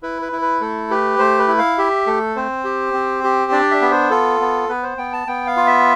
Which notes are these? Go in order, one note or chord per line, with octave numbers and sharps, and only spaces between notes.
E4 B4
B4
E4
B4
A3 A4
G4 B4
A3 C5
B4
E4
F5
G4 E5
A3 A4
C4 C5
G4
C4
G4
D4 D5
E5
B3
C5
F4 A4
B3
B3 B4
C5
B3 G5
A5
B3 G5
F5
F4
E5